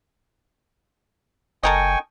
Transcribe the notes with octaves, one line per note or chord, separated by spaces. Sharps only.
F#1 A4 A#4 D#5 G5 G#5 C#6